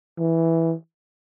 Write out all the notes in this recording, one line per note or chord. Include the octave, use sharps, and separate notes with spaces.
E3